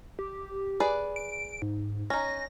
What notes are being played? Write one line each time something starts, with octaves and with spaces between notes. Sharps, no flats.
G4
G#4 B4 D5
D7
G#2
C#4 D#4 A#6